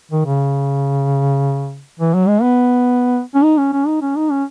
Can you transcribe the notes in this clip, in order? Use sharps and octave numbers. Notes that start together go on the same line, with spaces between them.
D#3
C#3
E3
F#3
G#3
B3
C#4
D#4
C#4
C#4
D#4
C#4
D#4
C#4